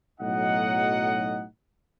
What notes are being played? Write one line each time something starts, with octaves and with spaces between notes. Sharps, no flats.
B1 A2 F#3 D#4 D#5 F#5